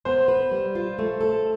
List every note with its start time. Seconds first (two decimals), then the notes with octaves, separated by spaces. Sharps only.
0.05 B3 C5
0.28 B4
0.51 G3
0.75 F4
0.99 A3
1.21 A4